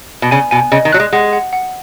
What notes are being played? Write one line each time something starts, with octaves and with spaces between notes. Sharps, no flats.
B2
C#3 G#5
B2 G#5
C#3 D#5
D#3
F#3 F#6
G#3
G#3 F#5
F#5
F#5